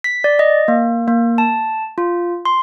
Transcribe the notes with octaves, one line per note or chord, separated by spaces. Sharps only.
B6
D5
D#5
A#3
A#3
A5
F4
C6